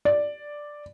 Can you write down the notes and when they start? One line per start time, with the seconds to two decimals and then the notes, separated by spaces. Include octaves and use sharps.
0.05 D5